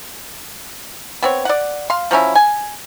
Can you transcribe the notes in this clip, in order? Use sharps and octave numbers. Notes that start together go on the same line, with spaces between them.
B3 C4 C#5
D5 F#5
F5 C6
F3 F#3 C#4 E4
G#5